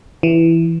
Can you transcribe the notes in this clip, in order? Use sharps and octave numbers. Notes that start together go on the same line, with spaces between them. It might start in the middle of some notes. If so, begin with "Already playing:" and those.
E3